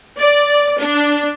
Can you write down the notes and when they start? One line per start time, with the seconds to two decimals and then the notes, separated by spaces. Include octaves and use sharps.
0.16 D5
0.78 D4